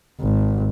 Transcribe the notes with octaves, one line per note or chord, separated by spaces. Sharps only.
G#1